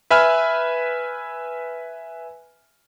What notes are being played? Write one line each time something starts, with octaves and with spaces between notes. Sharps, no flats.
B4 E5 G#5 B5 F6